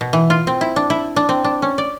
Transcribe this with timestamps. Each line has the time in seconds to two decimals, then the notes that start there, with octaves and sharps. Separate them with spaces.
0.01 B2
0.13 E3
0.30 F4
0.47 C4
0.61 E4
0.76 D4
0.90 E4
1.16 D4
1.29 C4
1.44 D4
1.62 C#4
1.78 D5